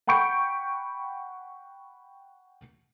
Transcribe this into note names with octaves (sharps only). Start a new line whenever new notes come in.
F#5 G5 B5 C#6 G6 D7